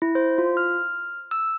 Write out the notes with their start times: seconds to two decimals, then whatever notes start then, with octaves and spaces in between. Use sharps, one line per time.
0.02 E4
0.15 C5
0.38 F4
0.57 F6
1.31 E6